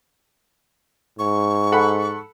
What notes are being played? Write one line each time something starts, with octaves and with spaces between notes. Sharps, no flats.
G#2 C#6
A4 F#5 B5